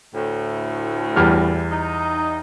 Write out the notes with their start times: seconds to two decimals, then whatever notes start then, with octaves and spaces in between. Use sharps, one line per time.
0.14 D2 A2
1.16 E2 G3 F6
1.70 D#4